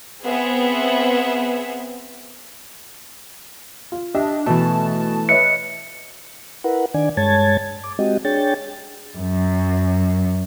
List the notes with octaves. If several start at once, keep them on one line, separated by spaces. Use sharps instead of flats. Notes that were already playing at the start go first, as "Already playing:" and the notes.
B3 C4 G#4 E5
F4
D4 G4 D#5 E5
B2 E3 A3 A5
B4 C#5 D#5 E5 C#7
E4 A#4 B4 F#5
D#3 D4 D5 G#5
G2 G#3 C#5 A5 G#6 A6
D6
G#3 C4 F#4 G4 D#5
D4 G#4 C#5 G5 A6
F#2